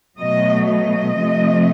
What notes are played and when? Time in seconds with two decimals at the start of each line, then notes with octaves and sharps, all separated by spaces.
0.19 B2 F#3 A3 D#5
0.69 D#5
1.18 C3 F3 A3